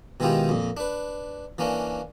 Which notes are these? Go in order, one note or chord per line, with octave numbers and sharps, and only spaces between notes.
B2 D#3 G#3 E4 F4 G4
F2 A#2
D4 B4
E3 A#3 C#4 D4